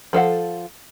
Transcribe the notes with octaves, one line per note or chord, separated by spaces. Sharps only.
F3 A4 F5 F#5